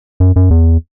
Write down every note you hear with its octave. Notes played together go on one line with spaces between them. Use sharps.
F#2
F#2
E2